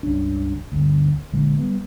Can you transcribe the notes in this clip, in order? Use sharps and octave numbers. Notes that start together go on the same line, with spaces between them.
C#2 G2 C#4 D4
G1 D2
A#1 A#2 D3 G#3
G3 B3